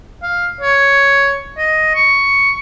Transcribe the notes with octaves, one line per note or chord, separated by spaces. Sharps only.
F5
C#5
D#5
C#6